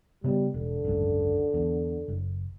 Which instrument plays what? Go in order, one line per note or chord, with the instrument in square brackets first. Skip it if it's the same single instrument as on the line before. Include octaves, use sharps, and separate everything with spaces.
[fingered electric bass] C#3 B3 [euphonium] G3
[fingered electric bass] E1 [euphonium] D3
[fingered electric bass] G#1 C#2 F#2
E2
F#1